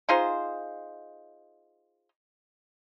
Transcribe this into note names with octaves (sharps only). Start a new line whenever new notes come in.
D#4 F4 G#4 C5